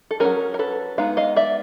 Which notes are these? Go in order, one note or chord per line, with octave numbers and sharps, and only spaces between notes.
A4
F#3 A#3 C#4 G#4 A#4
A#4
A4 B4
G#3 B3 D#4 F5
D#5 F5
D5 E5